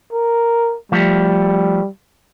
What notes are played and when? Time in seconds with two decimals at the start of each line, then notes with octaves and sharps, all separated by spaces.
0.13 A#4
0.92 F3 G3 A3